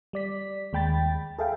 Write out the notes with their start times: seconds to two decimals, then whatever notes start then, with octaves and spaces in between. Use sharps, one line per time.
0.13 G3 D5 B6
0.73 D#2 G#3 G5 B5 A6
1.38 G#4 A4 E5 F5 G5